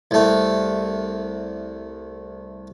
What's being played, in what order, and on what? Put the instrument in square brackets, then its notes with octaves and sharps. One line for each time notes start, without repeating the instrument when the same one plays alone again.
[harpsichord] C2 A3